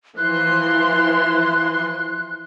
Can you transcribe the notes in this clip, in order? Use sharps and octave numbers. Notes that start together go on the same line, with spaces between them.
E3 F3 C6 F#6